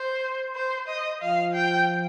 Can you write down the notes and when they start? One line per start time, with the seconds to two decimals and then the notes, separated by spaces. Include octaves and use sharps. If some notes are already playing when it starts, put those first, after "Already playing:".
Already playing: C5
0.55 C5
0.88 D#5
1.21 F3 F5
1.54 G5